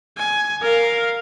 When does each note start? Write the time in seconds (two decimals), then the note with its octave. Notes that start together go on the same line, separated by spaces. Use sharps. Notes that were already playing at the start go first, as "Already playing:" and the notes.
0.17 G#5
0.62 A#4 F5